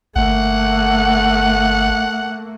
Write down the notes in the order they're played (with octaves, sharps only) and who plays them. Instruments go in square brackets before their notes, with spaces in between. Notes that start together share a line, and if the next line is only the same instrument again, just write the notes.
[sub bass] G1 [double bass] A3 A#3 [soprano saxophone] F#5